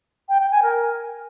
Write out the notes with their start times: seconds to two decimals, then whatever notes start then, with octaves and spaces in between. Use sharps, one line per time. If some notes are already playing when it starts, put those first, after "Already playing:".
0.28 G5
0.40 G5
0.51 G#5
0.62 A#4